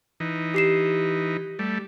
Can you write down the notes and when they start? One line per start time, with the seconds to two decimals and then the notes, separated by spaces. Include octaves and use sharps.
0.20 E3 D#4
0.54 G4 C7 E7
1.59 G3 A3